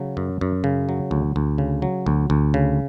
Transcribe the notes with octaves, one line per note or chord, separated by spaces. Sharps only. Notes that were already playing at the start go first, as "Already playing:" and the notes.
Already playing: C#3 F#3
F#2
F#2
C#3
F#3
D2
D2
C#3
F#3
D2
D2
C#3